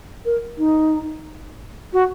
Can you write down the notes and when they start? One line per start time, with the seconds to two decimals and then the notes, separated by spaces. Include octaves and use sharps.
0.25 A#4
0.57 D#4
1.93 F#4